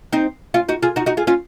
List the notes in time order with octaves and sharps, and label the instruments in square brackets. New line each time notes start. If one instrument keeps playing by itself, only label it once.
[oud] C4 D#4
C#4 F4
D#4 F#4
F4 G#4
D#4 F#4
D#4 F#4
F4 G#4
C#4 F4